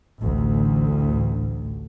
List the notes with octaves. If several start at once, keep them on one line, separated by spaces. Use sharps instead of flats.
A1 D2